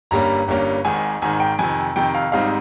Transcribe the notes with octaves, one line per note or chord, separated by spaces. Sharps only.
G1 G2 G3 A#3 C#4 A#5
G1 G2 G3 A#3 C#4
G#1 G#2 D#3 G#5
G#1 G#2 D#3 G#5
G5
F2 C3 D#3 G#5
F2 C3 D#3 G5
F5
G#1 G#2 G3 C4 D#4 F5